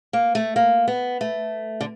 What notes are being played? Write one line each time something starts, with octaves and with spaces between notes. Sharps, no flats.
A#3
A3
A#3
B3
A3
D3